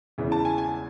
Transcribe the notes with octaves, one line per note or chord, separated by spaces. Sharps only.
E2 C#3 E3
A5
G#5
G#5